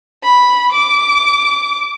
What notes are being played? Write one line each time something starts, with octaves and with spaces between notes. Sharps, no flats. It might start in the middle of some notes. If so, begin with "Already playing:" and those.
B5
D6